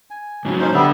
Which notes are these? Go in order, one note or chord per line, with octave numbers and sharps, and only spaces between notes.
G#5
G#2 C#3 F#3
C#4 D#4 C5
D3 G3 B3 E5